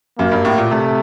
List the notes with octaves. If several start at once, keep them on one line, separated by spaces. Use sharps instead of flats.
F#2 A#3
G2
A2
A#2
C3 A3